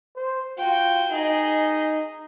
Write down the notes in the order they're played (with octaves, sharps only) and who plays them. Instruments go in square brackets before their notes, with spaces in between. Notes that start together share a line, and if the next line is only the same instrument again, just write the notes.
[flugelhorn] C5
[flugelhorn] F4 [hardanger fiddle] F#4 G5
[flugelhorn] D#4 [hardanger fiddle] G#4 D#5